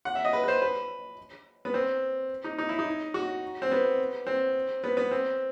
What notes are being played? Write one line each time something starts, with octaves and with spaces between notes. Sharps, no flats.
F#5
E5
D#5
B4
B4
C5
B4
B3
C4
D#4
D#4
E4
D#4
F#4
C4
B3
C4
B3
B3
C4